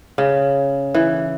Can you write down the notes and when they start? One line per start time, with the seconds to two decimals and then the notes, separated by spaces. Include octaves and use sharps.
0.18 C#3
0.94 E3